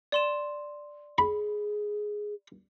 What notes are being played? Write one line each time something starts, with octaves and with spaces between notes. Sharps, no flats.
D5 C6 E7
G#4 B5